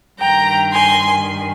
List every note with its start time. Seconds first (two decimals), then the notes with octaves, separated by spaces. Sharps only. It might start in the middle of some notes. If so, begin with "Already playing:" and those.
0.19 G2 D#3 G5 A#5
0.72 G#5 C6